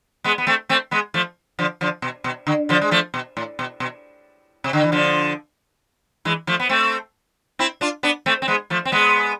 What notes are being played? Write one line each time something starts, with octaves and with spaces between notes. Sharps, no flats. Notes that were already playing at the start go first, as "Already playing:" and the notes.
G#3 B3
B3
A3 C4
A3 C4
G#3 B3
F3 A3
D3 F3
D3 F3
B2
B2
D3
D3 F3
G#3
F3 A3
B2
A2
B2
B2
C3
D3
E3
D3 F3
E3 G#3
F3 A3
B3
A3 C4
C4 E4
D4 F4
B3 D4
A3 C4
C4
G#3 B3
F3 A3
C4
G#3 B3